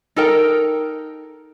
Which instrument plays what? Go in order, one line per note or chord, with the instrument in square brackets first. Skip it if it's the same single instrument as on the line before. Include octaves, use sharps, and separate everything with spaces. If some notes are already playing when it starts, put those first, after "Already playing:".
[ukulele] D#4 A4 A#4 G5